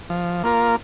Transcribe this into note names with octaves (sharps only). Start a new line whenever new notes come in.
F3
A#3 F4 A#4